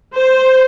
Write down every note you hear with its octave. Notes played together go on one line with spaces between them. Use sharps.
C5